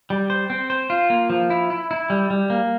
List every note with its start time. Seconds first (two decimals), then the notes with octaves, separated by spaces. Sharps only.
0.10 G3
0.30 C5
0.50 C4
0.70 C5
0.90 F4
1.10 A#3
1.30 F3
1.50 E4
1.70 E4
1.91 E4
2.10 G3
2.30 G3
2.50 A#3